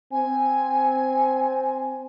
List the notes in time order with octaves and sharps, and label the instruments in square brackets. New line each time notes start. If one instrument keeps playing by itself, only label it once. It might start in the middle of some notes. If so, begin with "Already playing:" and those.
[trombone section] C4 [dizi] G#5